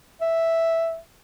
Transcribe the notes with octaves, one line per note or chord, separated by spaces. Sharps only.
E5